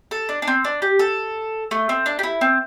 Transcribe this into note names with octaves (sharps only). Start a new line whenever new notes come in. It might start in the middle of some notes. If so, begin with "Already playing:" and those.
A4
D4
D4
C4
D4
G4
A4
A3
C4
D4
G4
E4
C4